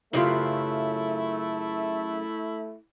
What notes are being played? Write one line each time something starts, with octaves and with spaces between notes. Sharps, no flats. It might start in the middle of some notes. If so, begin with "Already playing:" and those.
F#2 C#3 A3 E4 F4 G4 B4